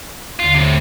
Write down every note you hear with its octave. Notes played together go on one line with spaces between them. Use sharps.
D#2 D3 F4
A2 C3